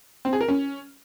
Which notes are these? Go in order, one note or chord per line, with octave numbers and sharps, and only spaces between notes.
C4
G#4
A#4
C#4